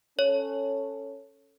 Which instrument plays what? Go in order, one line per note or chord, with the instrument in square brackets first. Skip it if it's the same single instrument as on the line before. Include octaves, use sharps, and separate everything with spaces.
[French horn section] C#4 A4 [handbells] C#5